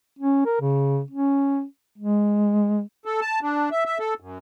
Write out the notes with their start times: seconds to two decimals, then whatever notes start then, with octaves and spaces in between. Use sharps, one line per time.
0.19 C#4
0.45 A#4
0.61 C#3
1.11 C#4
1.98 G#3
3.05 A4
3.21 A5
3.42 D4
3.71 E5
3.85 E5
3.99 A4
4.20 F#2